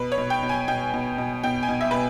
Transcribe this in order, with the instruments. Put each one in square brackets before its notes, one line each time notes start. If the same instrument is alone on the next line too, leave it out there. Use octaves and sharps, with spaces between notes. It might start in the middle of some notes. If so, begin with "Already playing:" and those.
Already playing: [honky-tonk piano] B2 B4
C#5
B2
G5
B2
G#5
B2 G5
B2
B2
B2 G5
G#5
B2
E5
B2 B4